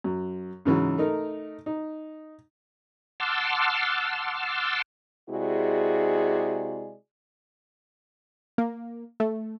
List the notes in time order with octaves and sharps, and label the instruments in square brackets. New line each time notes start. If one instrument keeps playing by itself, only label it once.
[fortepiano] F#2
G#2 C#3 E3 F#3
A3 D#4 A#4
D#4
[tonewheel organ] F#5 A5 C6 D6 E6 F6
[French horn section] C3 G#3 E4 F#4 G#4 D5
[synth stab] A#3
A3